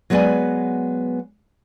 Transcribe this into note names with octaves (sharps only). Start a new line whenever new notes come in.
F#3 G#3 B3 B4 D5 G#5